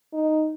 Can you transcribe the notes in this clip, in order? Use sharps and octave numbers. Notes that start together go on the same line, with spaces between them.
D#4